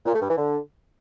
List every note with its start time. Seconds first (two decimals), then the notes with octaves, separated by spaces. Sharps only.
0.06 A#2
0.13 A3
0.21 G2
0.29 E3
0.36 D3